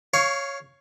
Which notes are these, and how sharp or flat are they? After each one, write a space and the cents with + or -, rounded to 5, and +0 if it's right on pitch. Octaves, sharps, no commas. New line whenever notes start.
C#5 +0 F5 +0 C#6 +25